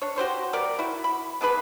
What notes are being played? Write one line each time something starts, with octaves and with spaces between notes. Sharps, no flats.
D4 C#5
F#4 G4 C5 C#5
G3 B3 A#4 D5
E4 F#4
B5
B3 D4 G#4 B4